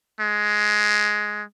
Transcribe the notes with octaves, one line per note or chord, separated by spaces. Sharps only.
G#3